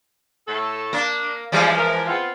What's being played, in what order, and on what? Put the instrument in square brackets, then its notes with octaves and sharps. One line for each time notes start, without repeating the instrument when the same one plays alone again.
[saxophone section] A2 A3 A4
[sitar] A#3 [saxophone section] D4
[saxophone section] C#3 G3 [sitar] E3 F3 G#3
[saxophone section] A#4
B3 C4 F4